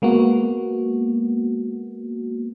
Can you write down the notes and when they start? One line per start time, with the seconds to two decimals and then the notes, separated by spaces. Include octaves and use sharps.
0.02 G#3 A#3 B3 F#4